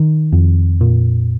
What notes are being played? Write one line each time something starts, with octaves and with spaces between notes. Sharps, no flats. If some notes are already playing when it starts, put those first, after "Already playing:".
Already playing: D#3
F2
A#2